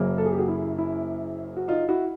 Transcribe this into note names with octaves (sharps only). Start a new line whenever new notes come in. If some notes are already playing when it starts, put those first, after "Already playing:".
Already playing: F#1 F#2 C#3 F#3 A#3
A4
G#4
G4
F#4 G#4
E4
E4
F#4
D#4 F4
E4 F#4